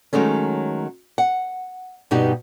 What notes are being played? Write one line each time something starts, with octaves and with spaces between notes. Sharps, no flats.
D#3 F#3 G#3 A3 C#4
F#5
G2 B2 D#4 G4